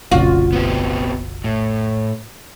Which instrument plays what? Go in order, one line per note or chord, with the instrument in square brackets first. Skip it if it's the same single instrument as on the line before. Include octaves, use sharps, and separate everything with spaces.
[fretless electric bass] F1 A#1 C#3 [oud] F4 F#4
[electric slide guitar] B3 C4 G4
A2